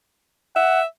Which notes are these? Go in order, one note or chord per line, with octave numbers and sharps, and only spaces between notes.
E5 F#5